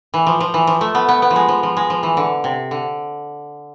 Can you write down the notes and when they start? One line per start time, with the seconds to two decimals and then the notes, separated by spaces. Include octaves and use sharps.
0.14 E3
0.27 F3
0.40 F3
0.54 E3
0.67 F3
0.81 A3
0.95 B3
1.08 B3
1.22 B3
1.30 F3
1.36 G#3
1.48 F3
1.63 F3
1.77 G#3
1.90 F3
2.03 E3
2.17 D3
2.44 C3
2.71 D3